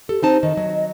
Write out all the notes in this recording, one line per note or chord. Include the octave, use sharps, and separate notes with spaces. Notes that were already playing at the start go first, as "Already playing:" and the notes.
G4 A4
C4 D#4 C5 A5
D#3 D#5
F#3